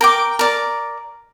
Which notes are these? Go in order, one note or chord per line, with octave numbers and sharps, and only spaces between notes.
A#4 G5 D6
A#4 D5